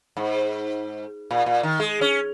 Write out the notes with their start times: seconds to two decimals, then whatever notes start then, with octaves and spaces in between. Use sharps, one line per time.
0.17 G#2
1.31 A#2
1.46 A#2
1.63 D#3
1.80 G#3
2.01 C#4